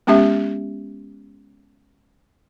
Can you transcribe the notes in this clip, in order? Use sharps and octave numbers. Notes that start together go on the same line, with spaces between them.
G#3 B3 C#4 G4 E5